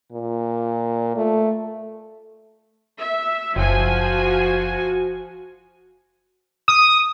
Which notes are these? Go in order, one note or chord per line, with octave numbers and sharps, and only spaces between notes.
A#2
A3
E5
F#1 F3 F#4 G#5
D#6